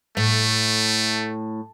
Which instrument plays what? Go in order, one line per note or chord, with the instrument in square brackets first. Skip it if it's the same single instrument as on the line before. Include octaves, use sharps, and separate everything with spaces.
[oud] A2 [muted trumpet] A3